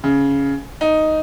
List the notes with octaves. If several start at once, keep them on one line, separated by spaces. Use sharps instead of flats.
C#3
D#4